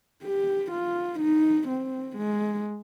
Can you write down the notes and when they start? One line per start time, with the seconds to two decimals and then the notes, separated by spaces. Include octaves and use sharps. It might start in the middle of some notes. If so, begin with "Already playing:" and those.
0.23 G4
0.71 F4
1.20 D#4
1.68 C4
2.17 G#3